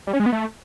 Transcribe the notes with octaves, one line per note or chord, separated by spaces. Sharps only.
G3
C#4
G#3
B3
A3